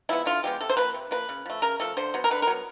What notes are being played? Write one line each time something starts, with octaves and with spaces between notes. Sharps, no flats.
F3 G#3 B3 E4
D3 F4
F3 G#3 B3 G4
C3 A4
C5
F3 A#3 B4
C3
F3 A#3 B4
C#3
F3 A3
C#3 A#4
F3 A3 A4
D3 C5
F#3 B3
A#4
D3 B4
A#4
F#3 B3